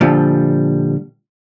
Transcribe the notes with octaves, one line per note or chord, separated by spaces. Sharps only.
A#2 D3 F3 G3